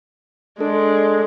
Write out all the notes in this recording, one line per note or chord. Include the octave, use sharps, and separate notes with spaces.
G#3 D4 A4